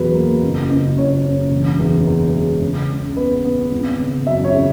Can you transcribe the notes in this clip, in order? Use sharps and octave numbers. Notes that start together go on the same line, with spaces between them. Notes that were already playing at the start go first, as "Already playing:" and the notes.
Already playing: E2 B2 F#3 B4
A#3
F#1
F#1
F#1 C#5
F#1
E1
E2
E2
G#3
C#3
C#2
B3 B4
B3
G#1
C#3
F#2 E5
C#5
C#3